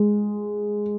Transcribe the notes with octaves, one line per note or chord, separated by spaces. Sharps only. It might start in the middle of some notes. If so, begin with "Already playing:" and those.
Already playing: G#3